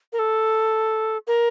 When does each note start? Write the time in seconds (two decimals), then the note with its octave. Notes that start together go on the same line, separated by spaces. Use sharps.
0.13 A#4
0.19 A4
1.27 A#4